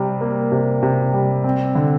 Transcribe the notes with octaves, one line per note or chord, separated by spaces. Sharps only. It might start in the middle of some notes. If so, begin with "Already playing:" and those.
Already playing: C3 G3
A#3
C3
C3
G3
C4
D3